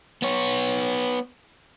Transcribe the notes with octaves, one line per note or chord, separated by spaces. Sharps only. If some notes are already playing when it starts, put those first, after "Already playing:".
B3 C#5